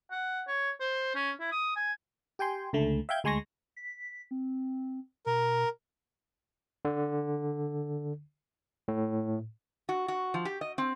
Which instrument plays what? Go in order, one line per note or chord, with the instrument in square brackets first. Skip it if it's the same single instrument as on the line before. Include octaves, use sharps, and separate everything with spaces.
[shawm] F#5
C#5
C5
C#4
E4
D#6
G#5
[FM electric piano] G4 G5 G#5 C6
C#2 D3 A3
E5 F5 G5 G6 G#6
D2 G#3 G#5 C6 C#6 A#6
[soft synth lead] B6
C4
[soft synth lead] B2 [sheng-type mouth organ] A#4
[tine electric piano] D3
A2
[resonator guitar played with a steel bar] F#4
F#4
F3
G4
D#5
C4